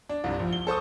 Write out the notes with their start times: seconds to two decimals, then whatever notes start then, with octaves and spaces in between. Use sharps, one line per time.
0.09 D4
0.24 C2 G2
0.39 A#1
0.53 G7
0.67 A4 C5 C#6 D#6